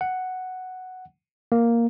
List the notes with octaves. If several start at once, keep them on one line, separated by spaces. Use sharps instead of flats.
F#5
A#3